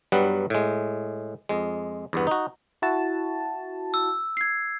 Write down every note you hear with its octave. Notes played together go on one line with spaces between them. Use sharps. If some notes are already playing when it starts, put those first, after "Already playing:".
G2 F#3 G3 B3 F#5
A2 G#3
F2 G#3
E2 G2 B3
D#4 F#4
E4 F#4 A5
E6
G#6 C7